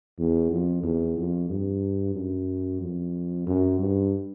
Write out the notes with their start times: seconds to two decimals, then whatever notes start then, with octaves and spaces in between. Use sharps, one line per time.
0.19 E2
0.51 F2
0.83 E2
1.17 F2
1.49 G2
2.15 F#2
2.81 F2
3.47 F#2
3.80 G2